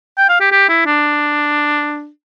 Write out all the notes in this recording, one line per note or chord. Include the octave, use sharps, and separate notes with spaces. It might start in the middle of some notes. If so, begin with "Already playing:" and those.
G5
F5
G4
G4
E4
D4